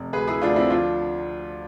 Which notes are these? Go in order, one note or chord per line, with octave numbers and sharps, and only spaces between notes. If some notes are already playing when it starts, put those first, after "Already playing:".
Already playing: F1
D2 G#4 B4
E4 G#4
D2 D4 F4
C4 E4
F3 D4 F4